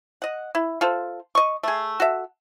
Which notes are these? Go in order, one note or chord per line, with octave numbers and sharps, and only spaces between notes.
D#5 F#5
E4
F4 A4 C5
D#5 C#6
A3 G#4
F#4 A4 E5